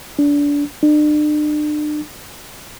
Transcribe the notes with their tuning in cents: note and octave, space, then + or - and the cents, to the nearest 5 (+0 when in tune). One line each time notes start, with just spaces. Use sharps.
D4 -25
D4 +40